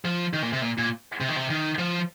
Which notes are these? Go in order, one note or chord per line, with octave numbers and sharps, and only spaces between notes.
F3
D#3
A#2
C3
A#2
A#2
C3
D#3
C3
D#3
F3